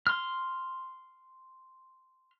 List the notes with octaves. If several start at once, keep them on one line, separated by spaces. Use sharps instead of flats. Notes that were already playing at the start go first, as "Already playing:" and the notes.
C6 F6